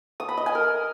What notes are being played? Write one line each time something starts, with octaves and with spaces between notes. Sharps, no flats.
D#6
B5
D#5
G#5
A#4